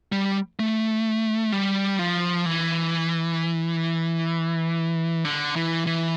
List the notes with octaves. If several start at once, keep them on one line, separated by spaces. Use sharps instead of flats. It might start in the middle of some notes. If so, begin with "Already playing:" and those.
G3
A3
G3
F3
E3
D3
E3
E3